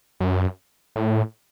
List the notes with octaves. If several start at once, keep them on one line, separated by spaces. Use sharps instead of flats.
F#2
A2